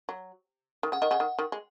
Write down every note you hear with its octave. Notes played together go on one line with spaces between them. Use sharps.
F#3
D#3
C#3 F#5
D#3 D#5
C#3 F#5
D#3
D#3
G#3